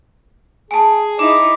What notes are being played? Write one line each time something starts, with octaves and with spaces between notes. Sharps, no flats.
G#4 G#5 A5
D#4 E4 D6 E7